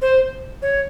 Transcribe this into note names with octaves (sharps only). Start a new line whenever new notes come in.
C5
C#5